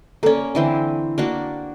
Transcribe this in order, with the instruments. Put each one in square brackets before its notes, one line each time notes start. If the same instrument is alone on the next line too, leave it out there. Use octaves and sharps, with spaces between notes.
[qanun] A#3 C#4 [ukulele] A4 D5
[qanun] D3 E3 C4
A#3 D4 F#4